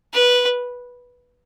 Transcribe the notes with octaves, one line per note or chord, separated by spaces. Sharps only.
B4